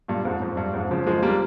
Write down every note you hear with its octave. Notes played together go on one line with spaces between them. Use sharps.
G2 A#2
F2 G#2
F2
G2
F2 G#2
C#3 F3
F3 G#3
G3 A#3